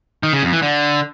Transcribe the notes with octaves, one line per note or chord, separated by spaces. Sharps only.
D#3
C#3
F2
E3
D3